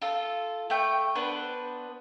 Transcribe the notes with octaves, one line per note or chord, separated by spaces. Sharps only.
F4 A4
A3 G5
B3 D4 B4 C5